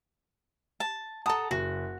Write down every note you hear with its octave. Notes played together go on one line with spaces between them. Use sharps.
A5
A4 F#5 A5 A#5 D#6
F#1 F#4